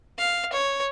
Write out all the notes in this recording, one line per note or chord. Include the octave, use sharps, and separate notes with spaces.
F5
C#5